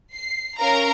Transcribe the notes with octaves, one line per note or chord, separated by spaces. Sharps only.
C7
C#4 A#4 F5 A#5